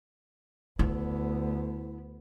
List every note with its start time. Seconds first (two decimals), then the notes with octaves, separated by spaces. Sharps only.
0.79 D2 B3 E4